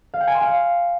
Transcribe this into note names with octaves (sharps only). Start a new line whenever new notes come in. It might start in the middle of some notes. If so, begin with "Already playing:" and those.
F5
G5
G#5
C6
F5